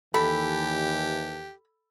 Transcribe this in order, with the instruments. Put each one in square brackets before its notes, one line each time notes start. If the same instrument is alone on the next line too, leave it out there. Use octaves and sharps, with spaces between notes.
[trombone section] D#2 E3 [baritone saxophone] G4 [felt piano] A4 [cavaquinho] B5